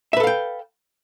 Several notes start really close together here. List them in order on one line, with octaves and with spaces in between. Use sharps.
E5 B4 A4 F5 G5